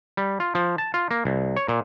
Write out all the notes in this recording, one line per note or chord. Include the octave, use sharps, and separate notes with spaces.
G3
F4
F3
A5
F4
A#3
C2
C#5
A#2